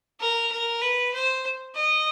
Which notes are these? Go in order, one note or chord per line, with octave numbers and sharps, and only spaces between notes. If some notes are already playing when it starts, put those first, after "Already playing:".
A#4
A#4
B4
C5
D#5